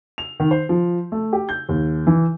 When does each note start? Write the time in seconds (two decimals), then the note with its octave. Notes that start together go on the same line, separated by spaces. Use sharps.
0.18 F7
0.40 D#3
0.51 C5
0.69 F3
1.12 A3
1.33 G4
1.49 G6
1.69 D#2
2.07 E3